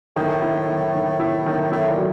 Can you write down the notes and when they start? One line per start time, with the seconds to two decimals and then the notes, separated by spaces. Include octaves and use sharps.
0.16 A2 D#3
0.42 E4
0.68 D#3
0.95 D#3
1.20 E4
1.46 D#3
1.72 A2 E4
1.90 A#2
1.98 F#3